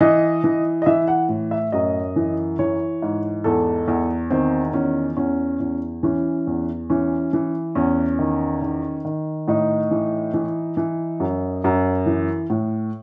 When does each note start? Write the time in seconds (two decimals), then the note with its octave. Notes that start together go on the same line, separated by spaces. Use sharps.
0.01 E3 D#5
0.44 E3
0.82 D#5
0.86 E3 E5
1.08 F#5
1.29 A2
1.51 E5
1.72 F#2 D#5
2.16 E3
2.59 E3 C#5
3.02 G#2
3.44 E2 A4
3.88 E2
4.30 D#3 C4
4.74 E2 C#4
5.17 E2 C#4
5.60 E2
6.03 E3 C#4
6.47 E2
6.90 E3 C#4
7.33 E3
7.75 E2 C#4
8.19 D#3
8.62 D#3
9.05 D#3
9.48 A2 D#4
9.91 E3
10.34 E3
10.77 E3
11.20 F#2
11.64 F#2
12.06 E3
12.50 A2